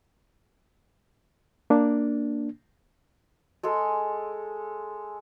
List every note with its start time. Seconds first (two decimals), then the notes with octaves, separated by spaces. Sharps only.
1.70 A#3 D4
3.63 G#3 G#4 A4